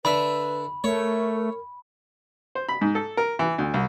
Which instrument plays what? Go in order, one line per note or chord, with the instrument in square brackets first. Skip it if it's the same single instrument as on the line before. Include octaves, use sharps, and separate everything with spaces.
[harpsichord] D3 E5 [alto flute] B4 [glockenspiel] B5
[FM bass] A3 [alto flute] A#4 [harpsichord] C#5
[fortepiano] C5
B5
G#2
A4
A#4
E3
D2
C2